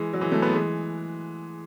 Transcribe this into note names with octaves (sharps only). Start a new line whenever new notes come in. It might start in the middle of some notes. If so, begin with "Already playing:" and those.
Already playing: E3 G#3
F#3
E3 G#3
F#3 A3
G#3 B3
E3 G#3